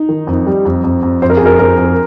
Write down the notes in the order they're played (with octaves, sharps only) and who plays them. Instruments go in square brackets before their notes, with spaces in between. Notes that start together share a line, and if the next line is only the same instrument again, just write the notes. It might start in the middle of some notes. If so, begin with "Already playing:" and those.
Already playing: [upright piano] D#4
[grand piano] D#3
F2
G3
F2
F2
F2
[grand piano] F2 [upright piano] C5
[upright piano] A#4
G#4
[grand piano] F2
[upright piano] A#4
[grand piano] F2 [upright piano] A#4
[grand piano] F2